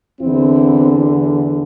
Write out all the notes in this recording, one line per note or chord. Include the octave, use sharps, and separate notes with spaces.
E2 D3 C4 E4